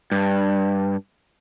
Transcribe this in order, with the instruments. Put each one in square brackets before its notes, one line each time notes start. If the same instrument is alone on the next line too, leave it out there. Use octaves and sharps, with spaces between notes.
[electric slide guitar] G2